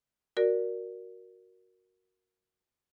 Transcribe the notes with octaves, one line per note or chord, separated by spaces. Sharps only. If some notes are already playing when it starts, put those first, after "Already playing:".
F#4 A#4 D5